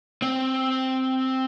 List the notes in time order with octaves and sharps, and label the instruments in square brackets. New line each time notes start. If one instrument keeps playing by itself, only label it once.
[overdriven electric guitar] C4